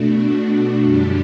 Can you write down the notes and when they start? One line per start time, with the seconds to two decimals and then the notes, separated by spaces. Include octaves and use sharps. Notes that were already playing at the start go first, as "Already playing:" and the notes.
Already playing: B2 A3 D4 F#4
0.83 F#2 D3 G3 D4 G4